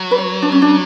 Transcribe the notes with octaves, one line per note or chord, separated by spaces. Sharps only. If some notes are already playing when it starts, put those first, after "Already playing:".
Already playing: F#3
B4
C#5
D4
C#4
D4